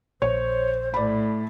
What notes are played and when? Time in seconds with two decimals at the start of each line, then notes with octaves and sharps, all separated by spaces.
0.22 A#1 C5 C#5
0.94 A2 D5 B5